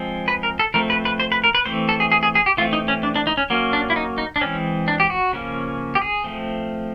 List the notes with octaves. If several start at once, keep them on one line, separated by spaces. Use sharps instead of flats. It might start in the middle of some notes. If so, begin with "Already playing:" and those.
Already playing: F3 G#3 C4
B4
A#4
A4
F3 A3 C4 A#4
B4
B4
C5
B4
A#4
B4
E3 A3 C4 C5
A4
G#4
G#4
G#4
G#4
G4
E3 A3 C4 F4
D#4
C#4
D4
D4
D#4
C#4
F#3 A#3 C#4
D4
E4
D#4
D#4
D4
E3 G#3 C4 C#4
D4
G4
F#4
C#3 F3 A#3 C#4
G4
G#4
F3 A3 C4